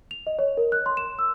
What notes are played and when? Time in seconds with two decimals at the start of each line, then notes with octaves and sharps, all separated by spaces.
0.11 F7
0.27 D#5
0.39 C#5
0.57 A#4
0.72 F#6
0.86 C6
0.97 E7
1.19 E6